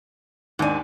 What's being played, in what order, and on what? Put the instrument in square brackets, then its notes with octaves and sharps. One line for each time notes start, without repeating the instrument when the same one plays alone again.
[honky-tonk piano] D#2 D4 [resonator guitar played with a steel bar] G#2 G#5